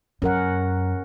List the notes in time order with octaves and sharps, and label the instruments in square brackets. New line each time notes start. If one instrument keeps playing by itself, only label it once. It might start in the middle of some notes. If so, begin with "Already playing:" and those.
[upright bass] F#2 [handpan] C#4 A#4 F#5